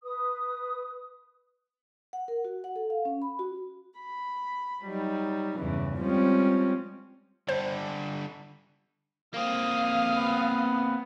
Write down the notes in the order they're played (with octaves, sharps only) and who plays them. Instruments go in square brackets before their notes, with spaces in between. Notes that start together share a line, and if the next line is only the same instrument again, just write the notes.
[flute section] B4 D#6
[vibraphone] F#5
A#4
F#4
F#5
A4
F5
C#4
B5
F#4
[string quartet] B5
F#3 G3 D#4
E2 G2 C#3 E3
F3 G3 G#3 C4 C#4
[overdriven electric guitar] D3 G3 [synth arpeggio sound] C5
[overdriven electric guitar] A#3 C4 [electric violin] F5 D#6
[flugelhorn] B3